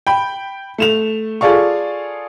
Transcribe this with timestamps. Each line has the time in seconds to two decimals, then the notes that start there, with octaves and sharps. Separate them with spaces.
0.07 G5 B5
0.78 A3 E7 F7
1.41 F4 G#4 A4 D5 F5 C#6